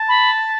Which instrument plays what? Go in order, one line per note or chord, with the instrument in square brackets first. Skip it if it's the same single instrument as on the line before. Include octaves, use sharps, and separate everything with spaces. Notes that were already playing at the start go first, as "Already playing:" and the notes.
Already playing: [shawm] A5
[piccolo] B5